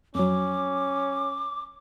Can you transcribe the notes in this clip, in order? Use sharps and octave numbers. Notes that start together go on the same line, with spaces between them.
F2 F#3 C#4 D6